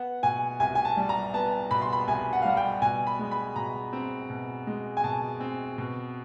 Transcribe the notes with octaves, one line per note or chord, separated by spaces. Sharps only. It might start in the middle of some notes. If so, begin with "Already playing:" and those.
Already playing: B3 F#5
B2 G#5
C2 G#5
G#5
A5
G3
A#5
B3 A5
B2 B5
C6
B5
C2 G#5
F#5
F5
G3 F#5
G5
B2 G#5
B5
G#3
B5
B2 A#5
C4
B2
G#3
G#5
B2 A5
C4
B2